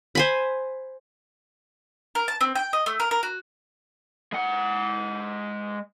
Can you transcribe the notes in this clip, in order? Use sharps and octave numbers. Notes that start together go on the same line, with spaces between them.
C5 G#5 B5
A#4
A5
C4
G5
D#5
A3
A#4
A#4
F#4
G#3 F#5